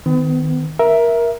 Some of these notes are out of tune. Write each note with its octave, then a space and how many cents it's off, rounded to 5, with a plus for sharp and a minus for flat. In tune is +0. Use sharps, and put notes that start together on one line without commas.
D#3 +0 B3 +40
A#4 +15 E5 +0